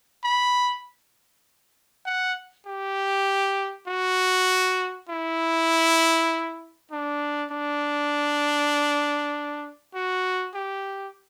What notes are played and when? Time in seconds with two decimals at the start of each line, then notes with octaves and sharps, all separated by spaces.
0.24 B5
2.06 F#5
2.67 G4
3.88 F#4
5.09 E4
6.91 D4
7.51 D4
9.95 F#4
10.55 G4